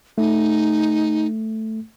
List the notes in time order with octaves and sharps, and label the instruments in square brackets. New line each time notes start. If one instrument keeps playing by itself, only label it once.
[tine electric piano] A3 [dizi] D#4